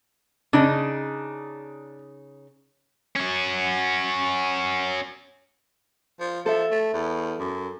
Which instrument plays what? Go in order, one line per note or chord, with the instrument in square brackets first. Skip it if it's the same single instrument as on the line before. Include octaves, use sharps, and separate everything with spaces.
[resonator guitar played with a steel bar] C#3 D#4 [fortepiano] D4
[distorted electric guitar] C#4 F#4
[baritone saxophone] F3
[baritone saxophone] F3 [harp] A4 E5
[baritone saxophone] A3
E2
F#2